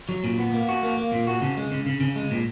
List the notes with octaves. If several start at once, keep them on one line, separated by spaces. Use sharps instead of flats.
F#3
A#2
B3
A#3
F#4
A#3
A#3
A#2
F#4
C#3
G#3
C#3
C#3
C#3
G#3
A#2